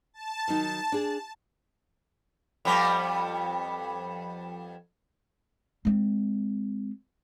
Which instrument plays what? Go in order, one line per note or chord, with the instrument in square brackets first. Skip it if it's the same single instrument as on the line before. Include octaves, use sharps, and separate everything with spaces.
[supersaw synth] A5
[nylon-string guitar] D#3 F#3 D#4
D4 G#4
[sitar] F2 G3 B3
[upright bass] G#3 C4